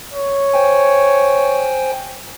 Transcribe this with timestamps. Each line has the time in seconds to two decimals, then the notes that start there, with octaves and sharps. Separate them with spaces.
0.14 C#5
0.54 C5 G5 G#5